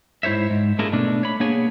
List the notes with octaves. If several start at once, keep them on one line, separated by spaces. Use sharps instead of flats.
G#2 E4 C5 C#5 E5
G#2
A3 D4 E4 F4 G#4 A#4
B2 A3 D4
C#5 B5
A#3 B3 D4 G#4 C#5 G#5